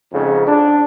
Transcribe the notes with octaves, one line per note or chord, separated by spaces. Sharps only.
F2 G#2 C#3
D4